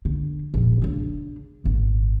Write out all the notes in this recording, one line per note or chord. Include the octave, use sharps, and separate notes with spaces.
D3
E1 A#1
C#3 D4
D#1 G#1